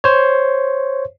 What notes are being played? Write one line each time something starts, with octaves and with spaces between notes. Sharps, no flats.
C5 C#5